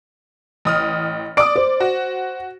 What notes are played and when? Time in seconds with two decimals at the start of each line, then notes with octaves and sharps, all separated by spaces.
0.65 A1 D#6 F6
1.37 D5 D6 D#6 D7
1.56 C5
1.80 F#4